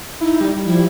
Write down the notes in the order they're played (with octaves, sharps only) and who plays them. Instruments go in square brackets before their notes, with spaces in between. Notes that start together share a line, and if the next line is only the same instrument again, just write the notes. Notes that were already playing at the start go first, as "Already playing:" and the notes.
[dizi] D#4 [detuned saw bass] E4
[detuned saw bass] G3
[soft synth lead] F3 [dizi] E4